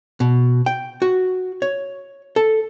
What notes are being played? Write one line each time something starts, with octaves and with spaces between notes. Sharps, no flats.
B2
G5
F#4
C#5
A4